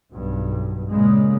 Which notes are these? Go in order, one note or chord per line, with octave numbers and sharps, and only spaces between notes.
B1 G2
A#2 C#3 G#3